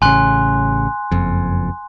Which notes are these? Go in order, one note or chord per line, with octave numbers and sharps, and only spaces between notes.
A1 C#3 G#5 C6 F#6
F#1 F2